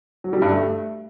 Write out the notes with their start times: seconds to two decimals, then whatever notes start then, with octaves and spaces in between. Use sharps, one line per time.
0.24 F#3
0.33 G3
0.42 G2
0.51 A3